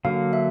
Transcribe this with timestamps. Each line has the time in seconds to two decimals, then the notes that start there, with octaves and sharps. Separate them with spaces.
0.05 D3 F#3 A#3 F5
0.33 E5